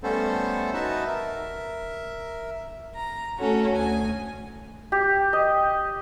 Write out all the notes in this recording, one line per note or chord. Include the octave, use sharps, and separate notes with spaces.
G3 A3 B3 C#4 A4 C5
D#4 F#4 B4 E5 A5
A#4 E5
A#5
A3 C#4 F#4 A4
D2 G#5
G4
D#5